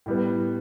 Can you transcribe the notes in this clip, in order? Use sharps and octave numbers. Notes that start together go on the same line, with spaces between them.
A2 G3 B3